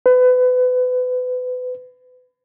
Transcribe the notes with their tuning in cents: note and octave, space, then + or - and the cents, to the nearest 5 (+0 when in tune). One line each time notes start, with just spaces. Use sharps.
B4 +30